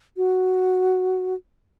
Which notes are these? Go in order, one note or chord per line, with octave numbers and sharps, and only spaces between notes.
F#4